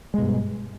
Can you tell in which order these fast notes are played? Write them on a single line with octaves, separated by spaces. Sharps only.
G#3 B2 G2